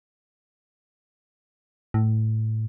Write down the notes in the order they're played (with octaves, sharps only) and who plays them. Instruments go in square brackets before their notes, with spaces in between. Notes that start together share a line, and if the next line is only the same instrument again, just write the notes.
[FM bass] A2